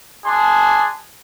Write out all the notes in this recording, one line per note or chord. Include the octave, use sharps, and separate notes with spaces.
D4 G#4 C6